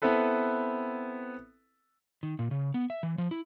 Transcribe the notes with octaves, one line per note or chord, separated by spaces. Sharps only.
B3 C4 E4 A4 B4
D#3
A#2
C#3
B3
E5
E3
F3
E4